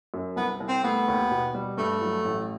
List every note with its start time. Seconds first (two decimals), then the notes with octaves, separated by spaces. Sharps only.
0.14 F#2
0.36 C2 B3
0.60 C2
0.68 C4
0.84 A3 B3
1.08 D#2
1.31 B2
1.55 G3
1.77 G2 A3
2.01 F#3
2.25 A1